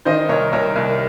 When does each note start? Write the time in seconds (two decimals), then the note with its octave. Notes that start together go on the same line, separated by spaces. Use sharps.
0.05 D#3 C5 D#5
0.29 C2 A#4 C#5
0.52 C2 A#4 C#5
0.76 C2